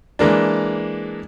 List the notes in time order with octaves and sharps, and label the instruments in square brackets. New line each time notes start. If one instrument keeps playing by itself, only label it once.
[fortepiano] E3 G#3 A#3 D4